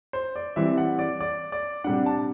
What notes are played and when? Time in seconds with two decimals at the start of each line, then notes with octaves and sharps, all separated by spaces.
0.13 C5
0.36 D5
0.56 E3 G3 C4 E5
0.78 F#5
0.99 D5
1.21 D5
1.52 D5
1.84 C3 G3 D4 F#5
2.06 A5